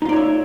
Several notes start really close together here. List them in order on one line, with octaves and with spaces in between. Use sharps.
D#4 F4 D5 C#5 E5